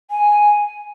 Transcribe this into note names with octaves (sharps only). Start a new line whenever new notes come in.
G#5